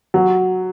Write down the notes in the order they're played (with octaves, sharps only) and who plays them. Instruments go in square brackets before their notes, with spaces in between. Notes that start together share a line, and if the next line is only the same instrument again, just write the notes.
[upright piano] F#3